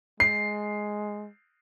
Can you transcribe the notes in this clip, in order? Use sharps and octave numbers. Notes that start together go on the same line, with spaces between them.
G#3 C7